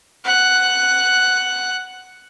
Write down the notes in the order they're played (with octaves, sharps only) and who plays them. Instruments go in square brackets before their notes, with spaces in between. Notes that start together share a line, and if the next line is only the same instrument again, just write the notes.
[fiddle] F#5 F#6